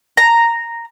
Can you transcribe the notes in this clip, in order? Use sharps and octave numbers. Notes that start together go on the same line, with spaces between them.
A#5